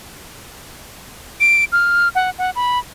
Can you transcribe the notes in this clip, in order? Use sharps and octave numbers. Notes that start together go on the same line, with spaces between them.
D7
F6
F#5
F#5
B5